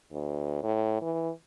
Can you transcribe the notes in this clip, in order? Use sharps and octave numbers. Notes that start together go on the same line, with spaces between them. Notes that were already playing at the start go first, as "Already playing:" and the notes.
D2
A2
E3